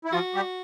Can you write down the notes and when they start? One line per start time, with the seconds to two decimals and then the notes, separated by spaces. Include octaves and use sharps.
0.05 E4
0.13 F3 F4 F#4
0.35 G3 G4